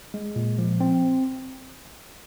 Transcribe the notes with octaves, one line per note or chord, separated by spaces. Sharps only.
G#3
A#2
F3
C4